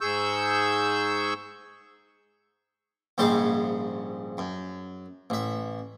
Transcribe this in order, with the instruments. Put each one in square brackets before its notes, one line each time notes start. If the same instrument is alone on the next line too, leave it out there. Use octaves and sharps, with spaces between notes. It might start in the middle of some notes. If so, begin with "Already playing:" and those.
[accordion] G#2 G#4 C#6 E6 G6
[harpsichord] A#1 G#2 C#3 G3 C5 D6
F#2
A1 E5